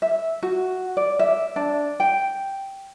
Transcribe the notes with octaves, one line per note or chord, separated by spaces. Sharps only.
E5
F#4
D5
E5
D4
G5